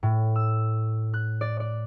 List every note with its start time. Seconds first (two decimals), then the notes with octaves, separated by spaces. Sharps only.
0.03 A2
0.36 E6
1.14 F#6
1.41 D5
1.60 D5